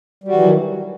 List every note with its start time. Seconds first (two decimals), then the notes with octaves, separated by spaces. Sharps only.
0.24 G3
0.28 F#4
0.33 E3
0.37 F#3
0.41 D#3